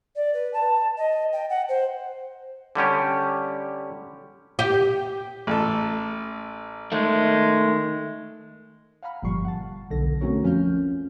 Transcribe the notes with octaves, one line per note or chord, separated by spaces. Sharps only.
D5
B4
A5
D#5
G5
F#5
C5
D3 G3 C#4 G4
G4
A1 A4
D#3 G#3 A3
F5 F#5 G#5 A#5 B5 F6
G1 A#2 F3 G3 C#6 C7
F#5 A5
B1 E2 D3 A4 A#6
A3 C4 C#4 F#4 A#4 C#5
F2 F3 C#4 F4 F6 G6